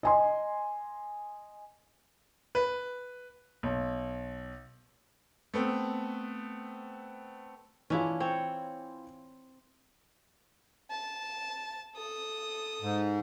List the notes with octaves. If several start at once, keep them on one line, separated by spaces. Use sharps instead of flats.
D#5 G#5 C6
B4
B1
A3 B3 C4
E3 C#4 D4 E4 F4
C4 C#5
A5
A4 D#6
G#2